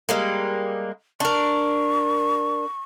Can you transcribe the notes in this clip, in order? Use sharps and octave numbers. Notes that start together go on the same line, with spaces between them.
G3 G#3 A#3
D4 A#4 C#6